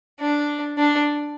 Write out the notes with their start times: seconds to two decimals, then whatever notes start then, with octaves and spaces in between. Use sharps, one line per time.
0.20 D4
0.77 D4